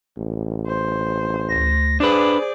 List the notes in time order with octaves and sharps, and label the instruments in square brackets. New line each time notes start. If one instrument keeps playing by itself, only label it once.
[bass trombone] A1
[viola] C5
[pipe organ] D2 A#6
[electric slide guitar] D4 B4 [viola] G#4 D5 [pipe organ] C5